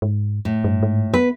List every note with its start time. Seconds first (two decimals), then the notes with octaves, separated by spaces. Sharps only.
0.02 G#2
0.45 A2
0.64 G2
0.83 G#2
1.14 B3 B4